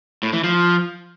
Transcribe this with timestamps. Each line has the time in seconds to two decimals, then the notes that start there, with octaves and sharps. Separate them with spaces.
0.23 A2
0.33 E3
0.44 F3